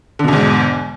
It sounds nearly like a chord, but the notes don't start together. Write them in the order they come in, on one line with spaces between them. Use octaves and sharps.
D3 B2 E2 G#2